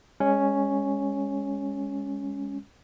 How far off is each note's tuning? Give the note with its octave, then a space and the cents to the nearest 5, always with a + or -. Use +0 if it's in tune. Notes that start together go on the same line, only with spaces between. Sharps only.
G#3 -25 C#4 +0